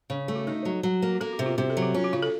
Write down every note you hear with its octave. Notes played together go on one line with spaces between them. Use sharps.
C#3
A3
F#4
D#4 A4
F#3
F#3
A#3
F#4
A#3 A4
F#4
C3
F4
C3 F#4
A4
F#3
F#4
C#4 F4
F#4
C#3 F4
A4